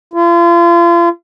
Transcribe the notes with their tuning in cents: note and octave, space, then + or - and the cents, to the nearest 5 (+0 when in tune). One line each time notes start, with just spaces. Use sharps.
F4 -35